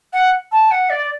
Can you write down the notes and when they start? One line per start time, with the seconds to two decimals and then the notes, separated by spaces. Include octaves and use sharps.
0.13 F#5
0.52 A5
0.71 F#5
0.90 D5